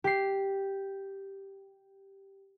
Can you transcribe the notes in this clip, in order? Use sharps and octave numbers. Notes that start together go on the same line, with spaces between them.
G4 C7